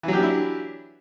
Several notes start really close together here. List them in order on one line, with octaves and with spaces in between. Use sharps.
E3 F#3 G4 D4 E4